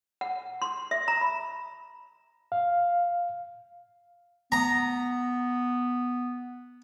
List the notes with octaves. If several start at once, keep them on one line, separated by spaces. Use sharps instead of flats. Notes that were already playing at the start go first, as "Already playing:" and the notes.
F#5
C6
E5
A#5
B5
F5
B3 A#5